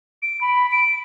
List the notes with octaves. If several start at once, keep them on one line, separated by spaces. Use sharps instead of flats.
D7
B5
D7